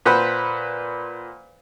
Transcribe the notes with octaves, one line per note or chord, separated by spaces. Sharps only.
A#2 B4 C5 F#5 B5